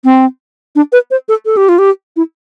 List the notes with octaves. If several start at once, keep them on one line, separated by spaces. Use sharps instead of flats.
C4
D4
B4
C5
A4
A4
G4
F4
G4
E4